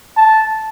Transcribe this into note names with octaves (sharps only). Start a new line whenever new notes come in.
A5